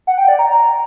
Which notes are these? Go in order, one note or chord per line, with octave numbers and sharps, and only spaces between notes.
F#5
G5
D5
A#5